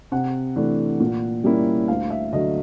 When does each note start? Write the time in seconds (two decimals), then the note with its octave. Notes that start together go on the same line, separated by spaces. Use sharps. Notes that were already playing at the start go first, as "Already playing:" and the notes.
0.12 C3 F#5
0.56 E3 A3 D4
1.00 A#2
1.44 G3 A#3 C#4 E4
1.88 D2 F5
2.10 E5
2.33 D3 F#3 A3 D#5